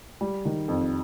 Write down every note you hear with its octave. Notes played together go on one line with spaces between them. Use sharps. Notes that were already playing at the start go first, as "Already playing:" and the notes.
G3
D#3
F2